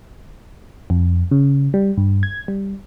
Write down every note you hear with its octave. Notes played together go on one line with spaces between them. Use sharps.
F2
C#3
G3
G2
G#6
G3